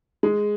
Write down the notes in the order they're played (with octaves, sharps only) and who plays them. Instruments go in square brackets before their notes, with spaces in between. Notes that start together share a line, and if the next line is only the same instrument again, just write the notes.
[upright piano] G#3